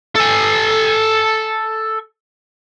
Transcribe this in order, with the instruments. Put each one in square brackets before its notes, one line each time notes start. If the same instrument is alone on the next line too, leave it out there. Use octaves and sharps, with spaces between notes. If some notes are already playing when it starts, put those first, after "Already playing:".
[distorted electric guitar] A4 G#5